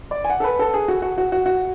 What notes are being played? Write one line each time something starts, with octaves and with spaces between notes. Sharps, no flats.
D5
G#5
F#5
A4
B4
A4
G#4
F#4
F#4
F#4
F#4
F#4